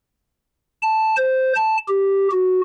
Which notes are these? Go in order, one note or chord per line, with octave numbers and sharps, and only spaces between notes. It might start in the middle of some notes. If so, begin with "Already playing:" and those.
A5
C5
A5
G4
F#4